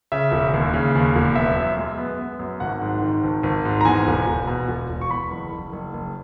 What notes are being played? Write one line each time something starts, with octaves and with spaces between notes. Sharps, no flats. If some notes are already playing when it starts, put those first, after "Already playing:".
C#3 E5
E1
D#2
C#3
D#2
E1
B3 E5
F#2
G#3
B3
B3
F#2
G#1 F#5
G#2
D#3
G#1
G#1
G#2
A#5
E2 G#5
E1
E1
B2
E1
E1
C#6
E2 B5
F#1
F#1
F#1
F#1